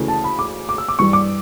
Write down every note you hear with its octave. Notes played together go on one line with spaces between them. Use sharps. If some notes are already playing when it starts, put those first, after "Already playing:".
Already playing: D2 C#3 E3 A3
A5
B5
D6
D6
E6
D6
G2 E3 G3 C#6
D6